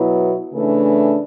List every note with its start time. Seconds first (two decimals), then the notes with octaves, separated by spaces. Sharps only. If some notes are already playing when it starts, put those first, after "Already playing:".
Already playing: B2 F#3 B3 E4
0.52 C#3 E3 A3 D4